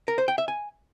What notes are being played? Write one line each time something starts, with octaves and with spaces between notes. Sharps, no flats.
A#4
C5
G5
E5
G#5